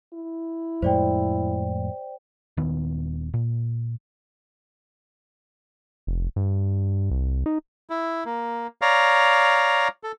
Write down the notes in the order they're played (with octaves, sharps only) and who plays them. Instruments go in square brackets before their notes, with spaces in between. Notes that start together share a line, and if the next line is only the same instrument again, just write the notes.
[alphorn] E4
[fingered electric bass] F2 A2 G#3 [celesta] C5 D5 G5
[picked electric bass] D#1 D#3 B3
A#2
[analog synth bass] F1
G2
C2
D#4
[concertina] E4
A#3
C#5 D5 F5 A#5
A4